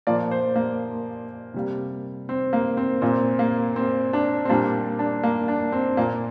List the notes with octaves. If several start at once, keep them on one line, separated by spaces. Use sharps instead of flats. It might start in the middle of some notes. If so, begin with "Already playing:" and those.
A#2 F3 A#3 D5
C5
A#3
C3 G3 A#3
C4
A#3
C4
A#2 A#3 C4
A#3
C4
D4
C4
A#2 G3 A#3 D4
D4
A#3
D4
C4
A#2 A#3